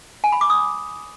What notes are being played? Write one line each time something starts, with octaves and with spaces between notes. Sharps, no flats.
G#5
B5
D6
D#6